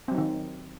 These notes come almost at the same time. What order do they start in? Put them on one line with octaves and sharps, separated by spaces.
C4 F#3 D#4 D#3